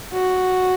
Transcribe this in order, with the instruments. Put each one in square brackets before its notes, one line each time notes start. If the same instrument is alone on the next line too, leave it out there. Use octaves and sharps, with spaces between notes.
[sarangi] F#4